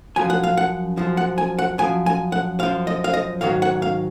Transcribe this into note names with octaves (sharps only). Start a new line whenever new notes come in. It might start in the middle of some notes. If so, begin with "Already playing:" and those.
F#2 F3 G#5
F#5
F5
F#5
F#2 F3
F#5
G#5
F#5
F#2 F3 G#5
G#5
F#5
F#2 F3 F5
D#5
F5
D#5
G#2 D#3 F#3 F5
F#5
F5